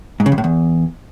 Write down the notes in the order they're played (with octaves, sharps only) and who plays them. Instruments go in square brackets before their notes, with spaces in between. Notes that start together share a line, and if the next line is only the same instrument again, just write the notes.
[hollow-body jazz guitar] G#2
C#3
F2
A2
E2